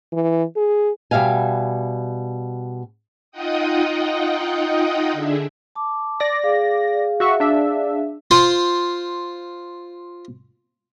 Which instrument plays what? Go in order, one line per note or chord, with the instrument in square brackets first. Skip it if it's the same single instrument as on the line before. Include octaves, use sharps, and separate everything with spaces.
[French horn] E3
G#4
[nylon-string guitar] B2 G3 E5 F5 G#5
[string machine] D#4 F4 D#5 F#5 G5 D#6
D3 D4 G#4 E5
[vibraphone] A5 D6
[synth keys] D5 A#6
[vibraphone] G#4 F5
[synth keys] F#4 E5 C#6
D4 E5
[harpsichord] F4 C5